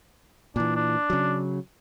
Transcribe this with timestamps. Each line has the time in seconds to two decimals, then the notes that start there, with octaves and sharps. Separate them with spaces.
0.56 A#2 E3 D4
0.75 D4
1.10 C#3 F#3